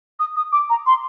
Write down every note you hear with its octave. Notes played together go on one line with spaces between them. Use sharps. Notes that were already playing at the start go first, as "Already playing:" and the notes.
D#6
D#6
D6
A#5
C6